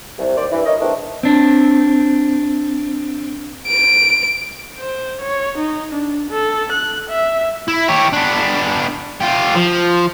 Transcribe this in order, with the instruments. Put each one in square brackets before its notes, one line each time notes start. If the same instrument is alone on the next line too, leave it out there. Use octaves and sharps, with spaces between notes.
[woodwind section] C2
D#2 C5 D5
G2 E3
A#4 C#5 D#5
E2 D#3 A3 C4 D4
[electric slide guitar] C4 D4
[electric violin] D7
C5
C#5
D#4
D4
A4
F#6
E5
[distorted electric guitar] E4
G4 C#5
B3 D4
F4 G4
F3